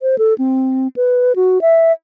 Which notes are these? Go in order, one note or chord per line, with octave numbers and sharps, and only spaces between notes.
C5
A4
C4
B4
F#4
E5